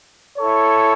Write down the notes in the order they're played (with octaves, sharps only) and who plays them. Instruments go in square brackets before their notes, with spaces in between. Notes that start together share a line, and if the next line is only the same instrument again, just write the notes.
[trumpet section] E4 A4 C#5